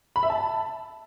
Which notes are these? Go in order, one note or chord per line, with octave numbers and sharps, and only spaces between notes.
B5
E5
A5